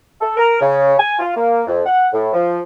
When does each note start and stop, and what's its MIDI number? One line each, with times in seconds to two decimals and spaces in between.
0.21 0.37 69
0.37 0.56 70
0.60 0.94 49
0.98 1.16 80
1.19 1.31 65
1.36 1.62 58
1.67 1.81 41
1.86 2.08 78
2.13 2.29 45
2.33 2.60 53